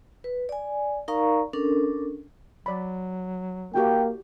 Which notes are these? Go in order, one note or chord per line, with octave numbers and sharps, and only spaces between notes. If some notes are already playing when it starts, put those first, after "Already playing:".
B4
D5 G#5
D#4 A#4 D5 F5 A#5 C#6
C#4 D4 A4 A#4
F#3 D5 B5
A#3 E4 F#4 G4 G5